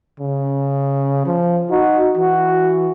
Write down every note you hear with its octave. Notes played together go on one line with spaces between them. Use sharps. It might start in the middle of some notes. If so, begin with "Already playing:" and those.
C#3
F3
D#4 F#4
E3 F#4